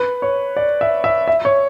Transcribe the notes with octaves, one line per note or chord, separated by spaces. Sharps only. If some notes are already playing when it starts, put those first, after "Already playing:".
Already playing: B4
C#5
D5
E5
E5
E5
C#5